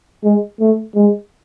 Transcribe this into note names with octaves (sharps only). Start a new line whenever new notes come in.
G#3
A3
G#3